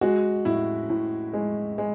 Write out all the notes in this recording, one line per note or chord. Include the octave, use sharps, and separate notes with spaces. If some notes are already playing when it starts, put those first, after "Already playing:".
G#3 F#4
A2 E4
A2
G#3
G#3